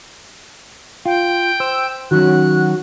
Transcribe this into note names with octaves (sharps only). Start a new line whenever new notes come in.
F4 G5
C5 E6
D#3 F#3 C#4 F#4 F#6